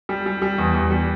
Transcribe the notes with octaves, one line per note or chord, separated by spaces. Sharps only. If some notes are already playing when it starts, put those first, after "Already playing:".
G3
G3
G3
E2
E2
G3